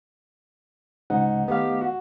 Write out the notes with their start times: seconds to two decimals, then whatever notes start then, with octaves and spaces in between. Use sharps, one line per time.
1.10 D2 G#2 C#3 D#4 F#5
1.48 D#2 A3 B3 G4 F5
1.81 F#4